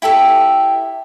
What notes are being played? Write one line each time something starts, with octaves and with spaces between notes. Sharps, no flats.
E4 G4 A4 E5